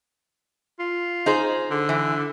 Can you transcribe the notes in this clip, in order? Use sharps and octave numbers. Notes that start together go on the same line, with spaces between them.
F4
D#4 G#4 C5
D3
E3